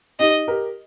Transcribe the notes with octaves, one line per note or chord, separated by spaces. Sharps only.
D#4 G4 D#5
G4 A#4